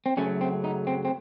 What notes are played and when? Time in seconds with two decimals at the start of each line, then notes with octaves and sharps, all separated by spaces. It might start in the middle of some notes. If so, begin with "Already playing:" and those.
0.06 C4
0.17 F#2 C#3 F#3 A3 C#4
0.41 C4
0.64 D#4
0.87 C4
1.05 C4